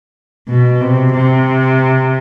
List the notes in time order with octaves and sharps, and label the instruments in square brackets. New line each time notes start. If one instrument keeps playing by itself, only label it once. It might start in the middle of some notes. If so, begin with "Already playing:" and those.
[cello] B2
C3
C3